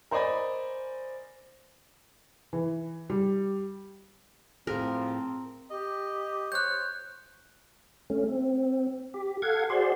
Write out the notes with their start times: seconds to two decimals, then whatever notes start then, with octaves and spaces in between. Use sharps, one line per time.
0.11 A#4 C5 D5 D#5 G#5 B5
2.53 E3
3.10 G3
4.67 A2 F3 C4 G#4 A#4
5.70 G4 D#5
6.52 C5 C#5 F#6 G6
8.10 A3 C#4
8.29 C4
9.14 G4
9.42 A4 F5 F#5 G#6
9.70 F#4 G#4 C5 D5 C6